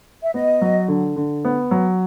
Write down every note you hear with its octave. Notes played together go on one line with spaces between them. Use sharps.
E5
B3 D#5
F#3
D3
D3
B3
F#3